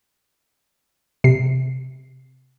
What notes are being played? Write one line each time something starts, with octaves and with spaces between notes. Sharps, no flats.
C3 C7